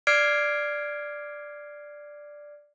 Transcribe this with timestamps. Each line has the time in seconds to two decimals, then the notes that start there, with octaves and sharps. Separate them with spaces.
0.07 D5 D6 F6 G#6 C7 D7